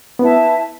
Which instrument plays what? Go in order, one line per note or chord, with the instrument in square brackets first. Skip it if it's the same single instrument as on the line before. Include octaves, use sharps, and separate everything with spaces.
[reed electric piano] B3 [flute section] E4 B4 E5 A5